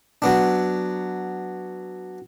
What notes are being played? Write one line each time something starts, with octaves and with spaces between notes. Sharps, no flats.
F#3 B3 D4